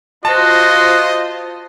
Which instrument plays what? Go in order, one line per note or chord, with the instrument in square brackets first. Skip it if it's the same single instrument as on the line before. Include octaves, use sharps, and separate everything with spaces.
[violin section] F4 C5 [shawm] F#4 [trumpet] D#5 [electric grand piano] A5